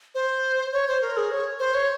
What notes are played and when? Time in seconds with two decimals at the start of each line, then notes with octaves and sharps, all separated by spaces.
0.15 C5
0.72 C#5
0.88 C5
1.01 A#4
1.17 G#4
1.31 C#5
1.59 C5
1.74 C#5